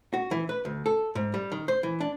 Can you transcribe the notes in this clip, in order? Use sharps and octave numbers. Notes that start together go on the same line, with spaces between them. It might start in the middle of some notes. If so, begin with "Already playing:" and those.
F#4
E3
B4
D2
A4
G#2
G3
D#3
C5
E3
D4